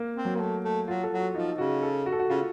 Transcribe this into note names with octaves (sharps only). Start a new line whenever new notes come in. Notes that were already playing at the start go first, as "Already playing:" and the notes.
Already playing: A#3
C4
F#3
A#3
A3
A3
F#3 F4
A4
F#3
F#4
F3 D#4
C#3 F#4
A4
F#4
A4
F#4
C#3 F4